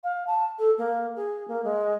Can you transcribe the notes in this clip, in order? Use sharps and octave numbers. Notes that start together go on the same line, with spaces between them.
F5
A5
A4
A#3
G#4
A#3
G#3